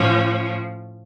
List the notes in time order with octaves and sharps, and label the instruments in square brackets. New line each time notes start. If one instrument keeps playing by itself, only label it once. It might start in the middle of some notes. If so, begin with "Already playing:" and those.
Already playing: [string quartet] A2 F3 C#4